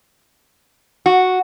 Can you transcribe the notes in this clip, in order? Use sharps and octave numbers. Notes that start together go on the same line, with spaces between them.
F#4